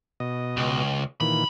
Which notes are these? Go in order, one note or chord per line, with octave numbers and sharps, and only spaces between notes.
B2 D#5
C#2
A#2 D#3 E3 B5